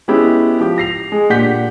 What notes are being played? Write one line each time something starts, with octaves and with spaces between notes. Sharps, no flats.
G#3 B3 C#4 E4 G4 G#4
F3 G4
A#6 C7 F7
G#3 G#4
A#2 D4 G4 F#5 G6 B6